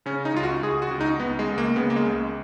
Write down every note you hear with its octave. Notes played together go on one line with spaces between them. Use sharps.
C#3 C#4
D#4
C#2 F4
F#4
C#2 G#4
F#4
C#2
D#4
C#2 B3
G#3
C#2
A#3
C#3 B3
A#3
G#3
C#2